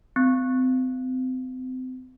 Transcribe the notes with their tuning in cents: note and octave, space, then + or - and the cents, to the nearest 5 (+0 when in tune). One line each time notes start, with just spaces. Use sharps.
C4 -35